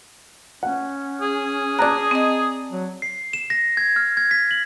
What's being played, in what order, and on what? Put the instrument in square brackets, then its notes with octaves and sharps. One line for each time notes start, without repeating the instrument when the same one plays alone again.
[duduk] C#4 [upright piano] F#5
[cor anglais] G#4
[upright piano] D5 A5 A#5 [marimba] D6 F#6
[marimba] C4 D#5
[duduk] F#3
[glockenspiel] C7
E7
A#6
G#6
F6
G#6
B6
F#7